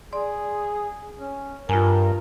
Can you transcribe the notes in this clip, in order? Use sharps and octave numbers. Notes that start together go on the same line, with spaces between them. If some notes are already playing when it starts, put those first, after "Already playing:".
G#4 D5 C6
C#4
G2 F4 A#4 G#5